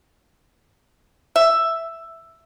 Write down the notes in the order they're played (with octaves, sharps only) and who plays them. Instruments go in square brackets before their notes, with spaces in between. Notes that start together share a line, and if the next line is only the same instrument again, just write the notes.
[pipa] E5